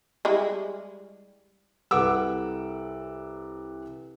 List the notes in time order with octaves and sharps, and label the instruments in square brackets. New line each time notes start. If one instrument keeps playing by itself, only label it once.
[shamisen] G3 G#3 E4
[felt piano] C2 A4 B4 F#5 D6 E6